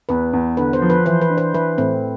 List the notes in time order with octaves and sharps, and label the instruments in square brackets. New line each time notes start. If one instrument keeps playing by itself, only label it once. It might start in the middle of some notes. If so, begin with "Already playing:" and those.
[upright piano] E2 [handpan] B4
[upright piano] E2
[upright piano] D3 [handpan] B4
[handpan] C5
[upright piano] F3
[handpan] B4
[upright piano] E3 [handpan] C5
[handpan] B4
[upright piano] D4
[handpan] C5
[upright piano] E3 [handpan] B4
[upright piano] A2 [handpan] C4